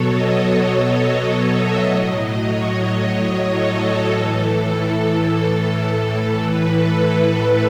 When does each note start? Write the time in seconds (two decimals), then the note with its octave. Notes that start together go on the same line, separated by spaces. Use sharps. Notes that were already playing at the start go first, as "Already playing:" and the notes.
Already playing: B2 F#3 A4 C#5
0.10 D#5
1.25 D#5
1.53 E5
1.82 A2 F#3 D#5
2.11 D#5
2.39 C#5
2.68 D#5
2.96 D#5
3.25 C#5
3.54 A4
3.83 A4
4.11 A2 E3
6.40 A2 E3 B4
6.69 A4
6.98 A4
7.26 B4